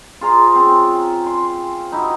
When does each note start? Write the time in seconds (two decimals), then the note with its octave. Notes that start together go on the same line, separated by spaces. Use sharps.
0.21 F4 G#4 C5 A#5
0.56 C4 C#4
1.26 C6
1.92 D#4 E4 F#4